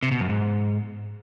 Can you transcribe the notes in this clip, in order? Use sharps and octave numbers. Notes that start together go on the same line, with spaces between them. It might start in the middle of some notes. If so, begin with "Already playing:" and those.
C3
B2
F#2
G#2